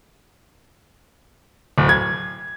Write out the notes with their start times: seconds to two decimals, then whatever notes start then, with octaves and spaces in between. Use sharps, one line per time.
1.78 D1
1.89 G#6